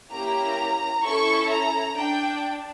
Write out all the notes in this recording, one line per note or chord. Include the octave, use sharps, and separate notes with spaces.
A#3 C#4 E4 G4 A#5
C#4 E4 A4 C#6
A#5
D4 G5